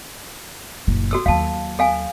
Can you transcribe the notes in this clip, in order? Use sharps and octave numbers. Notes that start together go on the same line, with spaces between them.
F#1 A#2
F#4 A4 E6
D#2 F#3 F5 A5
A4 F5 G#5